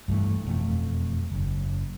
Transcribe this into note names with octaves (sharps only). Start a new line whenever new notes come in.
G2 E3 A3
E1 F2 A3
F#1